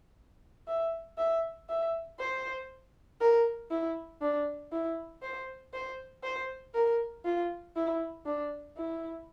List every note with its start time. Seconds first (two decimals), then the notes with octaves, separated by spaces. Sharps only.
0.67 E5
1.18 E5
1.69 E5
2.19 C5
3.20 A#4
3.71 E4
4.21 D4
4.72 E4
5.22 C5
5.73 C5
6.24 C5
6.74 A#4
7.25 F4
7.76 E4
8.26 D4
8.77 E4